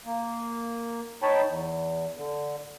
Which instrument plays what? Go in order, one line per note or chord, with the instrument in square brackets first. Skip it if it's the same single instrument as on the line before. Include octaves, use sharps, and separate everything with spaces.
[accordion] A#3
D#4 C#5 G5 A5 B5
E2
D3